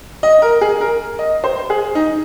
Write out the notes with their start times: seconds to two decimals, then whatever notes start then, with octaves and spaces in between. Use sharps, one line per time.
0.23 D#5
0.42 A#4
0.61 G#4
0.81 A#4
1.19 D#5
1.44 C5
1.70 G#4
1.95 D#4